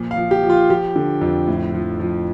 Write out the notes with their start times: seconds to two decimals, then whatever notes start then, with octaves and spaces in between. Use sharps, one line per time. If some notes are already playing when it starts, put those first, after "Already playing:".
Already playing: A#2 F3
0.11 F5
0.17 F3
0.31 G4
0.43 F3
0.50 F4
0.70 F3 G4
0.96 D3
1.21 F2
1.47 A2
1.74 F3
2.00 F3